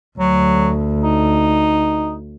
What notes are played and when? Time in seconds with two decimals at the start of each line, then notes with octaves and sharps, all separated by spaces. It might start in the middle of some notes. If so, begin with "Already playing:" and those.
0.19 D2 F#3
1.03 D#4